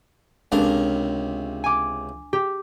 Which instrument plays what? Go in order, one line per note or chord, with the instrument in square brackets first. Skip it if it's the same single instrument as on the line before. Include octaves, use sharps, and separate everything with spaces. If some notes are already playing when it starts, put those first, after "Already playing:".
[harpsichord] C#2 C3 A#4 [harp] D4
[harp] G#5 D6
G4